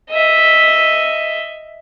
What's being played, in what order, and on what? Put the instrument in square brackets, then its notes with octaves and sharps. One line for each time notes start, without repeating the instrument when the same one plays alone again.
[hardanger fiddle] D#5 E5